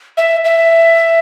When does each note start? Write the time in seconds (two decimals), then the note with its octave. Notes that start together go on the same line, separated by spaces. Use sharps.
0.17 E5
0.44 E5